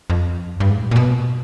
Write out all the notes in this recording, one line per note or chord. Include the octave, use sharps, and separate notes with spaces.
F2
G2
G#2
A2
A#2
B2